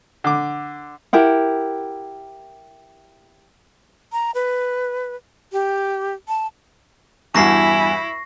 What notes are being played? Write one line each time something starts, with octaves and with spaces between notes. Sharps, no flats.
D3 D6
E4 G4 A#4 F#5
A#5
B4
G4
A5
E2 G2 E4 F#4 G#5 C#6 A#6 C7